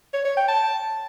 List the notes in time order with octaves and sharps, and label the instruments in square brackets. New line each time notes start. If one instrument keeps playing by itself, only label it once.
[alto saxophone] C#5
C#5
G5
A5